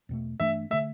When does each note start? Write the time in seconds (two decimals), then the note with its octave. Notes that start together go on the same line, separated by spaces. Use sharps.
0.09 E2 B2 A3
0.40 G2 E3 A3 D4 E5
0.70 D3 A3 E5